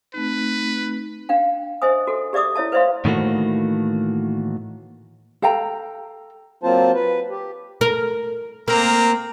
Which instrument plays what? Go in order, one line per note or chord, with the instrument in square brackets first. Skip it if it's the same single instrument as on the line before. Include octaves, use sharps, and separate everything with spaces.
[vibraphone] A3 C4 D#4 [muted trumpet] B4
[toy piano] D4 F5 G5
C5 D#5 E5 G#5 D#6
F#4 A4
G4 D5 E5 D6 D#6
E4 C#5 E5 A5
B4 C5 D5 E5 F5 C6
[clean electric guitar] A2 D#3 E3 A3 A#3 F#4
[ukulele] A4 F5 G5 A#5
[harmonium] F#3 A#3 C4 F4 C5 A5
B4
G4
[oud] A#4
[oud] A#3 [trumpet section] C4 A#5